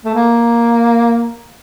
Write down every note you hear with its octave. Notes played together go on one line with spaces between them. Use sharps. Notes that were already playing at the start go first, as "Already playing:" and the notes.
A3
A#3